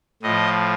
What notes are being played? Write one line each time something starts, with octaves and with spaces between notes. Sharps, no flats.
A2 F3 D#5